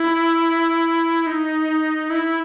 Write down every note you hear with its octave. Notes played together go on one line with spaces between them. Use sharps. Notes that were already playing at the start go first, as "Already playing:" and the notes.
Already playing: E4
D#4
E4